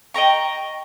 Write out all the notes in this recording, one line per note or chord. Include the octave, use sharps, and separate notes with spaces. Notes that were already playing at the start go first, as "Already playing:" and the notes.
D#5 G5 A#5 C#6